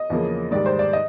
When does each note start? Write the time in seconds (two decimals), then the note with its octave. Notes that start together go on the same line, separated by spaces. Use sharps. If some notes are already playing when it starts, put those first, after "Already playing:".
Already playing: D#5
0.10 E2 C#3 F3 A#3
0.51 G#2 D#3 G3 D5
0.66 C5
0.79 D5
0.93 D#5